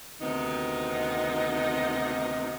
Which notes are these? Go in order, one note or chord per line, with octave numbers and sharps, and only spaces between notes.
D2 C3 D#3 B3 C4 D#4